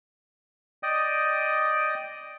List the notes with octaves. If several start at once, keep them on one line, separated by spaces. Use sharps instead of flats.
D5 D#5 G5 D#6